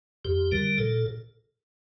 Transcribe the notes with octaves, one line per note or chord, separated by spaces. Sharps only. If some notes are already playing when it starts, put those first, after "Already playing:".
F2 G4
D3 G3 A#4
A#2 A4